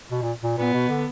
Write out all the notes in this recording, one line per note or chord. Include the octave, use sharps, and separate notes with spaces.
B2
A#2
A#2
A#2 B3
B2
D3